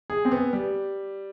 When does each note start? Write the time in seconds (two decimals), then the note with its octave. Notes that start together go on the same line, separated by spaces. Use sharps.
0.10 G#4
0.25 C4
0.31 B3
0.53 G3